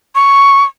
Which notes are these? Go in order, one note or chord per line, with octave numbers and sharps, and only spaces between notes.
C#6